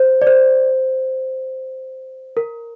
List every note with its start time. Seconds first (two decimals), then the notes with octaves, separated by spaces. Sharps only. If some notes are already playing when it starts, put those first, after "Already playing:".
Already playing: C5
0.22 D5
0.27 C5
2.37 A#4